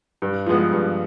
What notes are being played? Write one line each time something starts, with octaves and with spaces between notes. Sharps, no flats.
G2
F3 G#3 B3
G2